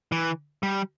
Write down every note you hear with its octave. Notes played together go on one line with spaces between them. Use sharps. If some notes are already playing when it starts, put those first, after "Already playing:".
E3
G3